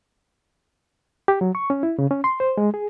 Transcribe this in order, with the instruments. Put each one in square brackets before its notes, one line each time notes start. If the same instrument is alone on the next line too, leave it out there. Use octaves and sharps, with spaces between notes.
[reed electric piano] G4
F#3
C#6
C#4
E4
C#3
C#4
C6
C5
G#3
G#4